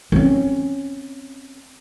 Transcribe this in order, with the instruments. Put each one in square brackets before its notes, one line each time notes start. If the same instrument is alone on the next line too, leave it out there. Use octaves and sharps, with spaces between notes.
[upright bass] C4 C#4